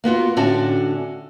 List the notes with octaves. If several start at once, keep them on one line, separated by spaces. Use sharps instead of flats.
A#3 B3 F4 F#4
A2 D3 C#4 D4 F#4 A5